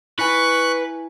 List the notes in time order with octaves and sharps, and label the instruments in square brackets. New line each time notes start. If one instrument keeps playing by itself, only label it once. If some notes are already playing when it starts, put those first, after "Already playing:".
[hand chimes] E4 G#5 [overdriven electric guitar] B4 [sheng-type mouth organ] C#6 F#6